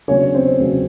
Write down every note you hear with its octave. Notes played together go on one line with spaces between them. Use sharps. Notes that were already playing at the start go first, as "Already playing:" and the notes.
C#3 F#3 B3 C#4 D4 C#5
C4 C5
C#3 F#3 B3 D4